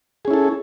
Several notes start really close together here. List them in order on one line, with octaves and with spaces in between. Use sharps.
G#4 C#4 E4 A4